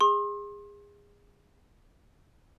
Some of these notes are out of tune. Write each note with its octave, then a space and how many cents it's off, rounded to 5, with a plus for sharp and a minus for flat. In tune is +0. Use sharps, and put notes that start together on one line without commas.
G#4 -30 C6 +35